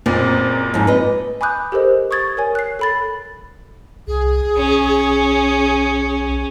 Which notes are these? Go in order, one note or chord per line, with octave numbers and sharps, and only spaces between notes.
F#1 A#2 C4
F2 G#2
B4 D#5
G#5 B5 D6 D#6 F#6 G6
G4 A4 A#4 C5 D#5
C#6 D#6 G#6 A6
A#4 C#5 G#5
F#6 C7
A4 B5 A6
C2 G#4
B1 C#4